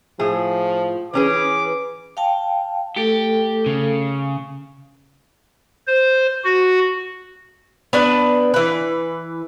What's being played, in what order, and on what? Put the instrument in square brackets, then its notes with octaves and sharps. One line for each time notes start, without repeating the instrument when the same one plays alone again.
[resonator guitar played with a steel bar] A2 G#4 [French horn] F3
[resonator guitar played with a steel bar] E3 C#4 G#4 [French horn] B4 [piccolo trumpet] D6
[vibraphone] F5 G5 A5
[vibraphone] A3 A4 [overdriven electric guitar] G4
[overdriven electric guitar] C#3
[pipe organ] C5
F#4
[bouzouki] B3 D4 B4 D5
E3 B4